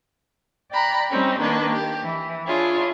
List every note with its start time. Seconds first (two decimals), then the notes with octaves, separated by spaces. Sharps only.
0.71 D5 G5 A#5 B5 F#6
1.11 G3 C4 C#4 D#4
1.39 D#3 A#3 D4 B4
1.71 G4
2.03 E3
2.46 D4 E4 F4 G#4 C#5